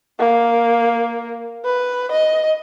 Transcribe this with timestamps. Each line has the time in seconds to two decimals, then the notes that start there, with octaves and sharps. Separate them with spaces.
0.19 A#3
1.65 B4
2.12 D#5